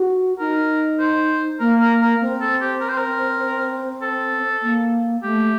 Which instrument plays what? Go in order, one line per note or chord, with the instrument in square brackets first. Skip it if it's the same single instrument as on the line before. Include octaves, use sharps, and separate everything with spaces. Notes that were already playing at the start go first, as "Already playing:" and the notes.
Already playing: [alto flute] F#4
[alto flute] D#4 [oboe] A#4
[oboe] C5
[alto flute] A#3 [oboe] A#4
[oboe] A#4
A#4
[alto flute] C4
[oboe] A4
G4
A#4
C5
A#4
A4
[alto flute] A#3
[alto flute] A3 [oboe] G4